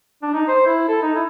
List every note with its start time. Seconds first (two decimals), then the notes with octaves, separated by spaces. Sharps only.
0.22 D4
0.34 D#4
0.48 C5
0.66 E4
0.88 A4
1.02 D#4
1.15 E4